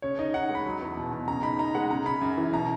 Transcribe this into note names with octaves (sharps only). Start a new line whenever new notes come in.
C#3 C#5
D#4 D#5
D#4 F#5
G#3
B5
F#3
E2
B2
B2
C#3 A#5
D#4 B5
D#4 A#5
G#3 F#5
C#3 A#5
C#3 B5
F#2
E3
B2 A#5